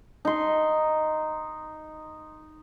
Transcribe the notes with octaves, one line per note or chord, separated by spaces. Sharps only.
D#4 C6